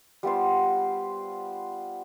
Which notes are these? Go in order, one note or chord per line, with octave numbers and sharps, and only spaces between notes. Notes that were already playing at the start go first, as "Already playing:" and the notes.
G3 B3 F4 C5